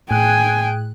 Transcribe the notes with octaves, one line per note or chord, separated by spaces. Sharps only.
A2 G#4 G5 G#5 F#6